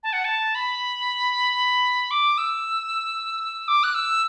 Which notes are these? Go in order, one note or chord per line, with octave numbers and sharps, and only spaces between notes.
A5
F#5
A5
B5
D6
E6
D6
F#6
E6